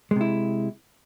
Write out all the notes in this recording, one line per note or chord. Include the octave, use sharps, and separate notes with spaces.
C3 G#3 E4